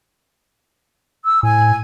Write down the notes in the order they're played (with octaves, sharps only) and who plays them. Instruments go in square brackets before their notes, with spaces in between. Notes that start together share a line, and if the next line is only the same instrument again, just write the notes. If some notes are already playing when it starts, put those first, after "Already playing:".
[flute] E6
[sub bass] A2 [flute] G#5